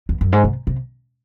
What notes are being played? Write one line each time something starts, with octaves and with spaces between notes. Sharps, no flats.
E2
F#2
G#2
C3
C3